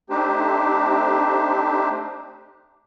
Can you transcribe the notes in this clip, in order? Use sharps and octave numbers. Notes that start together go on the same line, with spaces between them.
A3 C4 D4 D#4 G4 C5